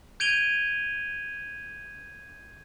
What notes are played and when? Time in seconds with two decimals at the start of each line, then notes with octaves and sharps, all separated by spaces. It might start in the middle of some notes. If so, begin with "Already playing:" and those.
0.20 G6 G#6 D7 D#7 F7 G7